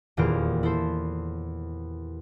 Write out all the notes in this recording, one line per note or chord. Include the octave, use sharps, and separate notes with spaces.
D#1 E2 A#2 C5 F6 D7
E4 A4 C5